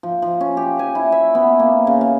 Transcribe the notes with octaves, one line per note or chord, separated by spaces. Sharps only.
F3
F3
C#4
G4
G#5
E4
E5
B3
A#3
C#3
F5